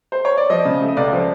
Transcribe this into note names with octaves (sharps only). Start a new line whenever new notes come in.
C5
C#5
D5
F3 D#5
C#3
A3
D#5
C#2 D5
F3